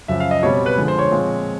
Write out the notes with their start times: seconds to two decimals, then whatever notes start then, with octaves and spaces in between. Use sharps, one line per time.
0.08 F#2 C#3 F3 E5
0.20 F5
0.31 D#5
0.43 B2 G3 C4 C#5
0.66 B4
0.77 D3 F3 G#3
0.88 C5
0.99 C#5
1.11 A#2 F3 G#3 C4